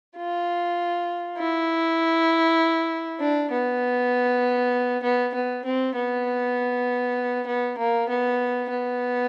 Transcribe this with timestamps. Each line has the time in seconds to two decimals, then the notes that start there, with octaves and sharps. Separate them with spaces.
0.16 F4
1.38 E4
3.20 D4
3.51 B3
5.03 B3
5.34 B3
5.65 C4
5.95 B3
7.46 B3
7.78 A#3
8.08 B3
8.69 B3